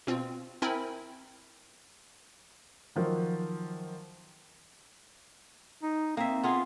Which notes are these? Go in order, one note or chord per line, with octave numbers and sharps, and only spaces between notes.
B2 C4 F4
C4 E4 A#4 G5 G#5 B5
D#3 F3 F#3
D#4
A#3 C4 E5
B3 F4 G#4